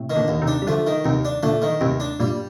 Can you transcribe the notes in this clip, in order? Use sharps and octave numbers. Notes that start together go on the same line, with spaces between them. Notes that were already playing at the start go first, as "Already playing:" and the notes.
Already playing: A2 C3
D#3
A#2 D3
D#2
C3 D#3
D4
G3
D3 F3 A3
D#3
D#2 C3 D#3
D4
A#2 D3 A3
D#3
D#2 A2 C3
D4
G2 A#2 G3